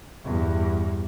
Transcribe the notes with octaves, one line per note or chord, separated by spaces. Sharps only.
E2 G2